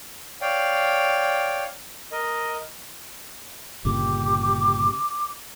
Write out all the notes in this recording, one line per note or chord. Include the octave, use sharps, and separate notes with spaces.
C#5 D5 F5 G5
A#4 D#5
G1 A#2 C#3 G4 D6